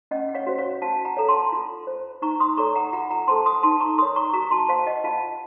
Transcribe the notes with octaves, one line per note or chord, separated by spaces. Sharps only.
C#4 D#5 F#5
F#5
C#5 F5
F#4 C5
C#5 F5
F#4 F5 A5
F#5 A#5
A4 C#5 A#5
A5 C6
F4
C5
D#4 A#5 C#6
C6 D#6
A4 C#5 A#5 C#6
F#5 A#5
F4 F#5 A#5
F#5 A#5
A4 C5 A5 C6
C6 D#6
D#4 A5 C6
A#5 C#6
A#4 C#5 C6 D#6
A#5 C#6
F#4 A#5 C#6
A5 C6
C5 F5 A5
D#5 F#5
F4 F5 A5